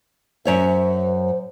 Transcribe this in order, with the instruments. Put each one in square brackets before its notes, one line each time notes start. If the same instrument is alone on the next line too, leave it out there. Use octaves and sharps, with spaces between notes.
[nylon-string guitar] F#2 C#5 E5 [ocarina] C5